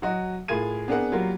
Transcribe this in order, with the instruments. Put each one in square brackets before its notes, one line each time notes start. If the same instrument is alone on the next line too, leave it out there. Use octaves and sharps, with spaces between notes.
[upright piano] F#3 F#4 D#5
A2 F4 G#4 A#4 G#6 D#7
B3 C4 D4 G#4 A#4 F#5
F#3 G3 A#3 F4 F#4 A#4